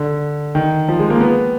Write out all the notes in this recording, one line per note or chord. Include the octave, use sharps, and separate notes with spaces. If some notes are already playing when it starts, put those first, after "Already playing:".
Already playing: D3
D#3
F3
G#3
A#3
B3